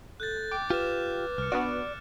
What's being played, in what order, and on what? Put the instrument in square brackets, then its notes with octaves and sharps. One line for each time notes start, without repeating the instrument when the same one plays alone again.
[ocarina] A4 [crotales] F#6 G6 A6
[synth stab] G5 [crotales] D6
[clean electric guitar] F4 G4 [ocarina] B4 [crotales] F6 E7
[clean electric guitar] C2 [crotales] F6 C#7
[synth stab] B3 D4 F#4 [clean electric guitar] D5